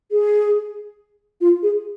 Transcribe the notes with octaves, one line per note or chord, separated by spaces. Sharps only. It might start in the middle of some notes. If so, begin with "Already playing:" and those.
G#4
F4
G#4